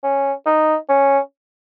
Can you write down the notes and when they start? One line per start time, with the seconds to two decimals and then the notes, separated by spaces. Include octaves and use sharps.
0.03 C#4
0.46 D#4
0.89 C#4